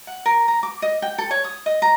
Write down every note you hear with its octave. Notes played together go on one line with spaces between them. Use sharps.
F#5
A#4
A#5
D6
D#5
G5
A4
C#5
D#6
D#5
A#5